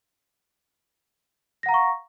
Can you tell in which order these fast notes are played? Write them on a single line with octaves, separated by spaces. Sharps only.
A#6 F#5 A#5 F5 C#6